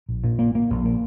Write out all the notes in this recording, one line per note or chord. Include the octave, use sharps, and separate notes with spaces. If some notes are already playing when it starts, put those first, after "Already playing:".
A#1
A#2
A#3
A#3
A#1
A#3